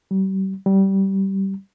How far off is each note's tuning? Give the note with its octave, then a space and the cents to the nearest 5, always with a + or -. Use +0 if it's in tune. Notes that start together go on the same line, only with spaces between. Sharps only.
G3 -40
G3 -20